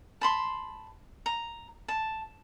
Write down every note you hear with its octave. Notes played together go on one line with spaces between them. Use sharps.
A5 B5 C6
A#5
A5